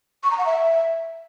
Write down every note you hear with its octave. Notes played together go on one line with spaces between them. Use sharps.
C#6
A#5
F#5
E5